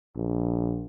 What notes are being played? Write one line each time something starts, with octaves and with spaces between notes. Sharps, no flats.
A#1